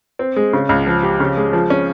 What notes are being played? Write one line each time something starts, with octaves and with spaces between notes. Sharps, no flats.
C4
G#3
C#3
C#2
F3
G4
C#3
G#3
F3
C#4